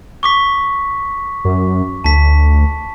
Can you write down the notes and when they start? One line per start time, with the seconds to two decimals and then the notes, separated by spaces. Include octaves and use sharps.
0.23 C#6 D6 B6
1.45 F#2
2.04 D2 A5 B6